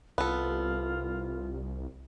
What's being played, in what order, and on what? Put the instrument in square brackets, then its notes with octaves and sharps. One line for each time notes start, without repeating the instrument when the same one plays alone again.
[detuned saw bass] C2 [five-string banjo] B3 A4 [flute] F4